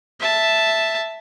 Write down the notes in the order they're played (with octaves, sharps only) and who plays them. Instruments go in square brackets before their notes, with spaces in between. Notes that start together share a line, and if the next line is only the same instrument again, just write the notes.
[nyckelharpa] E5 A5